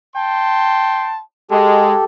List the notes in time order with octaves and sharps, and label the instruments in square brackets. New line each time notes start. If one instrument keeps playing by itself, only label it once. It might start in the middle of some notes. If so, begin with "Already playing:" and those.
[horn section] G5 A5 C6
[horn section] G#3 [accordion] G4 A4